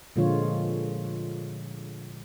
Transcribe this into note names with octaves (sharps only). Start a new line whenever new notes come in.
A#2 D3 F3 G#3 F4 C#5